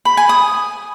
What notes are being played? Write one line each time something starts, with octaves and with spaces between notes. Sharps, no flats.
B5
G#5
D#6